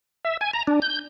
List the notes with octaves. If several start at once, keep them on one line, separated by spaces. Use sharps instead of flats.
E5
G#5
A#5
D4
G6